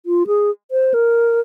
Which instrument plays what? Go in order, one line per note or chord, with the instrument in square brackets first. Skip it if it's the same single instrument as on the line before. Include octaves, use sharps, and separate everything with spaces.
[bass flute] F4
G#4
C5
A#4